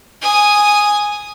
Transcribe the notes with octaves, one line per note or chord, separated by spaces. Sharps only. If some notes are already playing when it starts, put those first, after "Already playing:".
G#5 D#6